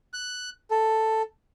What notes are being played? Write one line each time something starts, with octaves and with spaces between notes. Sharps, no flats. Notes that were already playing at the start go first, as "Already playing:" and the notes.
F#6
A4